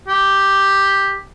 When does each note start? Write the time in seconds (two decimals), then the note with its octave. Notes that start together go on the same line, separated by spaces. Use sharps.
0.08 G4